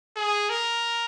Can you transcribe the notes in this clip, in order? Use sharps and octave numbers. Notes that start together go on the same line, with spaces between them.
G#4
A#4